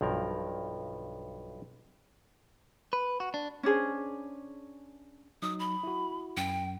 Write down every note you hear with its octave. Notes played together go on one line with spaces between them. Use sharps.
B1 G2 F3 A#4
B4
F#4
D4
C#4 D4 G#4 C5
F#3 D#4 D#6
B5
E4 F#4
F#2 G5